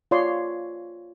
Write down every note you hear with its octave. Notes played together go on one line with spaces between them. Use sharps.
F4 C#5 D5 C6